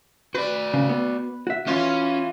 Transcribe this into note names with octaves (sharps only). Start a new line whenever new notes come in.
F#4 B4 D5
C#3
B3
F#4 E5
E3 C#4 F4